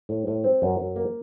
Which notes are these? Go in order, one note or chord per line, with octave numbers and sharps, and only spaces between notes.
A2
A2
C4
F#2
F#2
A#3